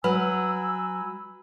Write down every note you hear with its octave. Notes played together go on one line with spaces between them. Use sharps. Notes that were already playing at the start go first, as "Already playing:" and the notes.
F#3 B4 G#5 B5 E6